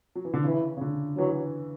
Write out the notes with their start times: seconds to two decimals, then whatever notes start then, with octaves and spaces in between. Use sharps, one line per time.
0.15 F#3
0.25 E3
0.34 D3
0.43 C#3 E3
0.77 C#3
0.81 D3
1.17 E3 F#3